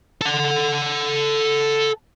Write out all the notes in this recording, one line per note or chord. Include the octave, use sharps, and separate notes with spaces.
A4 F#5